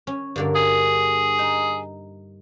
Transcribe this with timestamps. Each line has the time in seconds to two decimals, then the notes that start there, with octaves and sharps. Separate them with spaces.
0.07 C#4
0.36 G2 D3 A#3
0.55 G#4
1.39 D#4